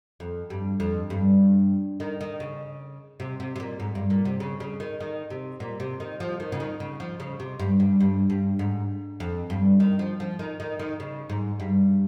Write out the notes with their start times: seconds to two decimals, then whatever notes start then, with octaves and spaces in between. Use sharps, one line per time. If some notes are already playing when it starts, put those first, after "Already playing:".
0.20 F2
0.50 G2
0.80 F2
1.10 G2
2.00 D#3
2.21 D#3
2.40 C#3
3.20 C3
3.40 C3
3.56 C3
3.60 A#2
3.80 G#2
3.95 G2
4.10 A#2
4.25 C3
4.40 C#3
4.60 C#3
4.80 D#3
5.00 D#3
5.30 C3
5.60 A#2
5.80 C3
6.00 D#3
6.20 F3
6.40 D#3
6.52 C#3
6.60 D#3
6.80 C#3
7.00 F3
7.20 C#3
7.40 C3
7.60 G2
7.80 G2
8.01 G2
8.30 G2
8.59 G#2
9.20 F2
9.50 G2
9.80 D#3
9.99 F3
10.20 F3
10.39 D#3
10.60 D#3
10.80 D#3
11.00 C#3
11.30 G#2
11.60 G2